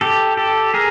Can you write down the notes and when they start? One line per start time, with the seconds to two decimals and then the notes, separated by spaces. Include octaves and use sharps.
0.01 G4 A4
0.37 G4 A4
0.74 G#4 A#4